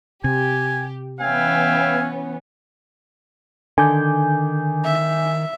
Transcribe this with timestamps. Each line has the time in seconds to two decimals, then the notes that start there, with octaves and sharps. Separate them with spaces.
0.24 C3 G4 G#5
1.21 E3 B3 C#4 E5 F5 G5 G#5
3.78 D3 D#3 G#5 D6 G6
4.85 E5